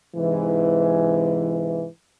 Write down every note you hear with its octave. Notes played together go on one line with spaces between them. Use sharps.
G#2 C3 E3